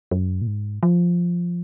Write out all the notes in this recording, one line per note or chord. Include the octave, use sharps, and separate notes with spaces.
F#2
A#2
G#2
F3